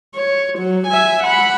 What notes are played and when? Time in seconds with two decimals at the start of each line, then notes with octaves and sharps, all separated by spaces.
0.15 C#5
0.58 F#3
0.87 E5 G#5
1.23 F#5 B5